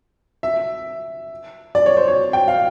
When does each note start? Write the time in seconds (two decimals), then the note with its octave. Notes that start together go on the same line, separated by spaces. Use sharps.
0.43 E5
1.75 D5
1.86 C#5
1.97 C5
2.08 C#5
2.33 G5
2.48 F5